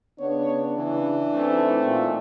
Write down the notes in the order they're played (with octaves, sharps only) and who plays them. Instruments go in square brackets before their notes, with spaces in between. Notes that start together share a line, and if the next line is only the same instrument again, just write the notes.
[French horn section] C#3 B3 [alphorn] D4 [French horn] C#5
[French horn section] C#3 [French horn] E3
[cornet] A3 [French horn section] C4 D#4
[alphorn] A#2